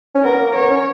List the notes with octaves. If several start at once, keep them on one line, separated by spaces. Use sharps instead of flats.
C#4
B3 A#4
A#3
B3 C#5
C#4